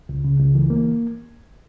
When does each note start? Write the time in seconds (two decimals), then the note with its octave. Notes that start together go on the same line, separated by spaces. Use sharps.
0.09 C#2
0.24 C#3
0.40 C#2
0.55 E3
0.70 A#3